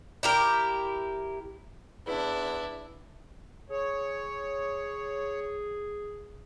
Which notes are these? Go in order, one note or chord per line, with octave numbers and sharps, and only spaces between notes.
E4 G4 A#4
E2 D4 E4
G#4 C#5